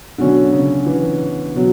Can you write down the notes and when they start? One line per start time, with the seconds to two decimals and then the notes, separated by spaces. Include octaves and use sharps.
0.18 B2 D3 F#3 C#4
0.53 C#3
0.86 E3
1.55 B2 F#3